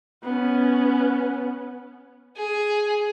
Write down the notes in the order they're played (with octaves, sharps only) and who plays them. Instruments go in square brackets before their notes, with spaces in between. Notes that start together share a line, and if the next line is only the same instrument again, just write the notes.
[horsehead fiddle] B3 C#4
[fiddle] G#4